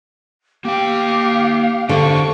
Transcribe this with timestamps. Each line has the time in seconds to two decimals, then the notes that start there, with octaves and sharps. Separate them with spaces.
0.65 A#3 G4 F5 G5
1.89 D3 A3 G4 C5 C#6